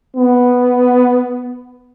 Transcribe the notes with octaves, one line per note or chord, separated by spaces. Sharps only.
B3